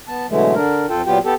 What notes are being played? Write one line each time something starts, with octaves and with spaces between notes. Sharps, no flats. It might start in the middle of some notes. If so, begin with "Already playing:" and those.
B3 A5
B2 D3 E3 F#3 G#3 A3
D3 D4 A#4
F2 F4 A4 G5
A#2 F#3 B3 F4 G4 G5
B3 G4 A4